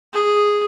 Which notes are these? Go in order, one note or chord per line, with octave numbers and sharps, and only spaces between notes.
G#4